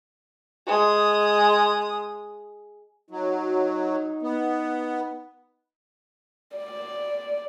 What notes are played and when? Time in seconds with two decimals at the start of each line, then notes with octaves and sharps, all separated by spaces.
0.67 G#3 D#6
3.11 F#3 D#4
4.22 B3
6.57 D5